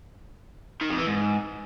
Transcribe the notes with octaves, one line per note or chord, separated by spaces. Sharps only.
D#3
F2
E3
G#2